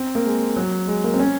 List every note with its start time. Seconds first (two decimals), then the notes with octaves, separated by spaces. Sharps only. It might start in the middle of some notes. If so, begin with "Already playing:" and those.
Already playing: C4
0.15 A#3
0.25 G#3
0.56 F#3
0.87 G#3
1.04 A#3
1.14 C4
1.19 C#4